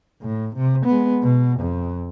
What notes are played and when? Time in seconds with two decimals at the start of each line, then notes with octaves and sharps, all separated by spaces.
0.22 A2
0.56 C3
0.86 G#3 B3
1.23 B2
1.60 F2